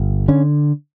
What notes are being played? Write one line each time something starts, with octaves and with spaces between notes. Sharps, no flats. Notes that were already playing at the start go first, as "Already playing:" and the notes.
Already playing: G1
D3 C#4